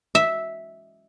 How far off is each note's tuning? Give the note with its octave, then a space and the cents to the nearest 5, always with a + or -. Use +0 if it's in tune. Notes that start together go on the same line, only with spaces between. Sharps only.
E5 -5